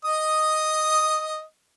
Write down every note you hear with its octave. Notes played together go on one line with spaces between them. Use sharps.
D#5 D#6